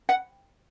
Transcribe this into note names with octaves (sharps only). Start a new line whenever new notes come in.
F#5